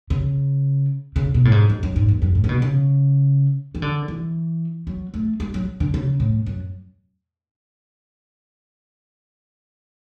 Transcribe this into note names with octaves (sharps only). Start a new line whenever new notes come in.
C#3
C#3
B2
A2
G#2
F#2
F#2
G#2
E2
F#2
A2
C#3
B2
C#3
E3
D3
E3
F#3
A3
G#3
F#3
D3
C#3
A2
F#2